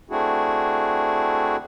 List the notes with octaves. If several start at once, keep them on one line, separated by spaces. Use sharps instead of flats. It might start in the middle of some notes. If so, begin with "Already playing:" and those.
A3 C4 D4 E4 F#4 G#4